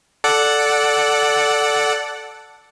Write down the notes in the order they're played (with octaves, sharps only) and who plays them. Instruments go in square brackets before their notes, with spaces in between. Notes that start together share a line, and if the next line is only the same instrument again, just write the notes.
[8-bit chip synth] A4 D5 F#5